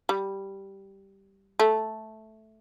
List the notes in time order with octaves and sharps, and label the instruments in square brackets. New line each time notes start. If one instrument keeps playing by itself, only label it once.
[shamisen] G3
A3